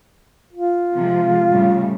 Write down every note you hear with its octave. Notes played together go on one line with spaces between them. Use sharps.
F4
C3 F3 G#3
A2 C#3 G3